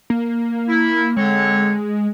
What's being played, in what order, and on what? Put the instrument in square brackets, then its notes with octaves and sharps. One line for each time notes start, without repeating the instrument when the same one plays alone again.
[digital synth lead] A#3
[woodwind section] E4
[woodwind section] D3 C4 C#5 [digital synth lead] G#3